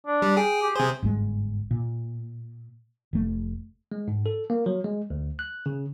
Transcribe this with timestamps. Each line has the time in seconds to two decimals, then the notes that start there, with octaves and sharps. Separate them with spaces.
0.07 D4
0.22 G3
0.37 G#4 G5
0.62 G4
0.76 C3 G#4 C5
1.02 G1 G#2 D3 G#3
1.71 A#2
3.13 F1 A3
3.92 G#3
4.08 G#2
4.26 A4
4.50 A#3
4.66 F#3
4.84 G#3
5.10 D2
5.39 F#6
5.66 C#3